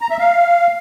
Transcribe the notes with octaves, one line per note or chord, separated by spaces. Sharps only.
A#5
E5
F5